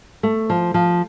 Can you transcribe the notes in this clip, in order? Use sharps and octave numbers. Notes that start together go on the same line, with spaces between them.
A3
F3
F3